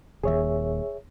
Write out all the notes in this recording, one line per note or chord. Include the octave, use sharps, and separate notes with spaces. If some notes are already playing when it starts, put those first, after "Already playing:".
D#1 D#2 G#4 C#5 E5